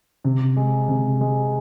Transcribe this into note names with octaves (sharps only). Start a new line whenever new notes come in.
C3
G#3
C3
G#3